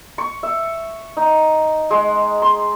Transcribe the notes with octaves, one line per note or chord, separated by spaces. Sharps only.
C#6
E5
D#4
G#3
C6